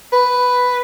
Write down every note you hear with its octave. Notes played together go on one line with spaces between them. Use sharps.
B4